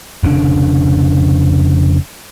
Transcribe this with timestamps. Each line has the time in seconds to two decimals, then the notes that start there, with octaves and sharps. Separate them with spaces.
0.23 F1 C#3 D4